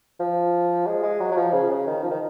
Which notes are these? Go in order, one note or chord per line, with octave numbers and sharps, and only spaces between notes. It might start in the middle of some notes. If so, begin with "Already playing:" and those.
F3
G#3
G#3
F#3
F#3
F3
C#3
C#3
D#3
F3
D#3